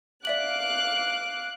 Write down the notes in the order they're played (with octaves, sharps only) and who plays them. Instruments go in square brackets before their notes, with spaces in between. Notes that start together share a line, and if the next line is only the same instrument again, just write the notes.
[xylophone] D5 E5 F#7 [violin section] F5 D6 F#6